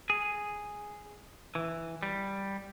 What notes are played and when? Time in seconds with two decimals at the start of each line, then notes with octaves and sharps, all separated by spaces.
0.10 G#4
1.55 E3
2.03 G3